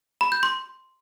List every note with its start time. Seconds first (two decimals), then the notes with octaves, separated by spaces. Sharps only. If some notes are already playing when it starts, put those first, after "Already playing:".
0.21 B5
0.32 G6
0.43 C6